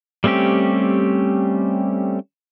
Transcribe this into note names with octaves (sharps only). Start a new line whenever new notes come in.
G3 A3 C4 C#4 G4